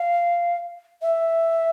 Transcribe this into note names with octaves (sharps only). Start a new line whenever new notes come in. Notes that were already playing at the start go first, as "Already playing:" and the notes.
Already playing: F5
E5